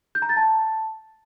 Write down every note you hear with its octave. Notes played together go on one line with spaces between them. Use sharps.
G6
A#5
A6
A5